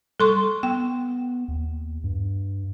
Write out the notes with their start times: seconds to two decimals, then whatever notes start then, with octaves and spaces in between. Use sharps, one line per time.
0.20 G3 A4 C6 C#6
0.63 B3 G5
1.48 D#2
2.04 G2